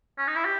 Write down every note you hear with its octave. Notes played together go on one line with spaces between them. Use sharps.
C#4
D#4
E4
G4